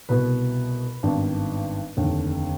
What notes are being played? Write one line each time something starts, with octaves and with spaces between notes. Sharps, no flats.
C2 B2 B3 B4
G#1 G2 D#3 B3 D4
F1 D#2 D3